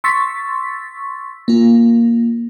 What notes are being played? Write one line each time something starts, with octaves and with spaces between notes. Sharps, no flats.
C6 C#6 E6 A6 B6
A#3 F4